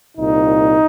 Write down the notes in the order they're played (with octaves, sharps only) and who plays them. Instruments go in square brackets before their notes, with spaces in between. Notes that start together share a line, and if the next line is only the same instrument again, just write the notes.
[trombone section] C2 A#2 D#4